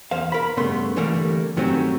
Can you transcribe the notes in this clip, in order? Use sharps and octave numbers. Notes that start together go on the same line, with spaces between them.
E2 C5 F5
A#4 B5
G2 C#3 A3 B3 C6
C2 D3 E3 G3 A3 A#3
G2 D#3 F#3 A3 C4 C#4